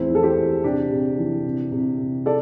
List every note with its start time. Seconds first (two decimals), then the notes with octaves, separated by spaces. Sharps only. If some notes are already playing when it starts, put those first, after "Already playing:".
Already playing: E2 A2 C4 E4
0.10 E3
0.15 A4
0.23 G4 C5
0.37 E2
0.63 C3 D4 G4
0.91 C3
1.18 E3
1.45 C3
1.72 C3
1.99 C3
2.26 A4 D5